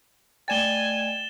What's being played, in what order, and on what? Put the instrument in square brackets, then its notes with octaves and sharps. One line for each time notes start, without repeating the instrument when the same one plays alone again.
[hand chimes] A3 D5 G5 [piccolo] G#5 [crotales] A6 E7 G7